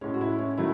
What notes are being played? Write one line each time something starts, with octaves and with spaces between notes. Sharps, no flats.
A2 G#3 C#4
F#4
E4
C#4
D#3 F#3 A3 E4